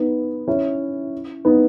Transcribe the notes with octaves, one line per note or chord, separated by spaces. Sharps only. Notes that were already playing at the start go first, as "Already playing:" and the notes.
Already playing: B3 D#4
C#4 E4
B3 D#4